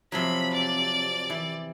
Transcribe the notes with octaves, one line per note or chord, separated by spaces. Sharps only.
C3 F3 F#3 B5
D5
E3